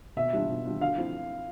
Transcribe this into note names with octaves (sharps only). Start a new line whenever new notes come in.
B2 E5
G3 D4 F4
B2
G3 D4 F4
D3 F5
F3 C4 E4